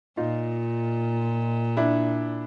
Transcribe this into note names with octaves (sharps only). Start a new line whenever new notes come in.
A#2 D#4 F4
D4 E4